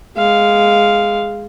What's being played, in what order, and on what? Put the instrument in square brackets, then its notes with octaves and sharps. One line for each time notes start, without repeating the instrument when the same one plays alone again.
[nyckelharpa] G#3 F5